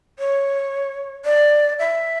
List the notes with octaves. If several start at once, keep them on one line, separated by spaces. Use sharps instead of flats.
C#5
D5
E5